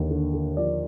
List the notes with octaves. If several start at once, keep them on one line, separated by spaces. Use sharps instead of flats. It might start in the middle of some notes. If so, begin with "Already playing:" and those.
Already playing: D#2 D3
D3
D3
F3 D5